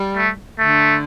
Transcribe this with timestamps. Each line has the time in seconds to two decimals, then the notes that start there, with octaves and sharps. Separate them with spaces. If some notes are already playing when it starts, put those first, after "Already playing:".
Already playing: G3
0.16 A3
0.59 D3 A3